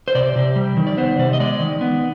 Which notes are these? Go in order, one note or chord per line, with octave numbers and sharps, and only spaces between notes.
C5
C3 D5
C3
G3
D#3
D5
B3 C5
C3 D5
D#5
G#3 D5
D#3
B3